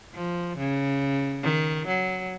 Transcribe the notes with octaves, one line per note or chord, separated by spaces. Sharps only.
F3
C#3
D#3
F#3